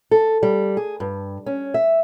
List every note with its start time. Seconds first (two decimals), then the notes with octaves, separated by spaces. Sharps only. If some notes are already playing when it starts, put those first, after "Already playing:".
0.11 A4
0.43 G3
0.77 G#4
1.00 G2
1.46 C#4
1.74 E5